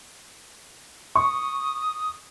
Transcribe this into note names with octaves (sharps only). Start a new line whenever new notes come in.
C#6 D#6